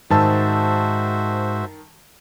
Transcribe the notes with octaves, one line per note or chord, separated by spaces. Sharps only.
G#2 D#3 F#4 C5 E5 A5 E6